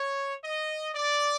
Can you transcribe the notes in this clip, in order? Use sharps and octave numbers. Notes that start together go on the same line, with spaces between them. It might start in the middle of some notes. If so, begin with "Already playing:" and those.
Already playing: C#5
D#5
D5